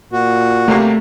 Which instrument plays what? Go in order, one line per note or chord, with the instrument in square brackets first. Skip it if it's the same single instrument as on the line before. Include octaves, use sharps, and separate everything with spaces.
[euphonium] A#2 [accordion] F#4
[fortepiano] C3 G3 A#3 [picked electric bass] A3